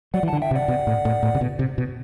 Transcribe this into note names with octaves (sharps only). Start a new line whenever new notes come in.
F#3 D5 F#5
E3
F#5 A5
D3
E5 G5
C3
D5 F#5
B2
A2
A2
A2
C3
B2
C3
B2